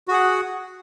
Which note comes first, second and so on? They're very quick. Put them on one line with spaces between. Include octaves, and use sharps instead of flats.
F#4 G#4 F#5